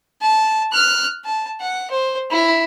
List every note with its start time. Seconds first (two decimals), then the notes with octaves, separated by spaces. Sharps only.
0.21 A5
0.72 F6 F#6
1.25 A5
1.60 F#5
1.90 C5
2.30 E4